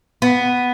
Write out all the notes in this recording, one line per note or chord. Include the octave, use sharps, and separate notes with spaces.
B3